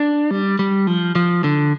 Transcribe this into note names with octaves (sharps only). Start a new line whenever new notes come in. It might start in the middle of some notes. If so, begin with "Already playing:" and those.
Already playing: D4
G3
G3
F3
F3
D3